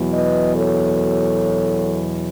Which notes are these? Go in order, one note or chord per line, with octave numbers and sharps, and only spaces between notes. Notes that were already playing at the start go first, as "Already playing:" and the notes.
Already playing: E2 B2 F#3
B4 D#5
A4 C#5